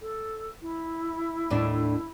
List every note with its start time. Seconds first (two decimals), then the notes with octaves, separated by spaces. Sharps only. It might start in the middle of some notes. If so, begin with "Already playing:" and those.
0.01 A4
0.62 E4
1.50 D#2 A2 D4